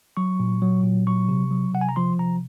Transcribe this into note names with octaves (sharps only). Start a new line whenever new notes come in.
F#3 C#6
A#2
F#3
A#2
F#3 C#6
C3
F#3
C3 F#5
G#5
A#5
F3 C6
C3 A#5